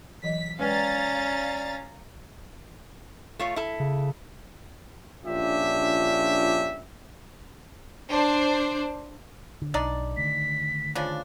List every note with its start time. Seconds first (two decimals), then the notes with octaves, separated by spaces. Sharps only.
0.23 E3 F#3 D#5 B6
0.59 G#3 C#4 B4 D5 F5 G5 A#5 A6
3.39 A3 F4 C#5
3.56 E4 A4
3.80 C#3
5.26 A#1 C#4 D4 F4 G4 E5
8.10 D4 C5
9.62 D3
9.74 B1 D4 D#4 D5
10.17 D3 D#3 A3 B6
10.95 C#3 F3 D4